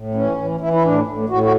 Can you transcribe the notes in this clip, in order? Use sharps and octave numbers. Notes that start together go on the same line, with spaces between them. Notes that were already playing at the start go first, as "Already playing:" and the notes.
Already playing: A2
E3 C#4
E3
E3 E4
E4
A2 D4
A2
A2 F#4
F#4